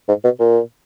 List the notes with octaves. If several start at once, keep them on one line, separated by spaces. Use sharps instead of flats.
G#2
B2
A#2